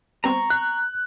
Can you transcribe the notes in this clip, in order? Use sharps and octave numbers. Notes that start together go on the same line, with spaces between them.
G3 B3 C4 A#5 C#6
F#6